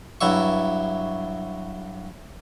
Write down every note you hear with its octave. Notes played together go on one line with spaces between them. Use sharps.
G2 F#3 E4 E5 C#6